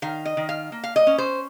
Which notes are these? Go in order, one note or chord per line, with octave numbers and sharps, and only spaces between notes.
D#3 F5
D#5
D#3
F5
A#3
F5
D#5
C#4
C5